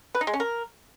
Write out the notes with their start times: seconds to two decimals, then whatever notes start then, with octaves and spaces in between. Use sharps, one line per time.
0.15 B4
0.21 D#4
0.27 G#3
0.34 C#4
0.40 A#4